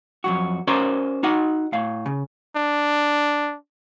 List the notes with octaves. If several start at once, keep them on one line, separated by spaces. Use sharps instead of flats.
F2 F#3 F#4
C#4 F#4 A#4 C5 D5 D#5
D#4 F#4 D#5 F#5
A2 F5
C#3
D4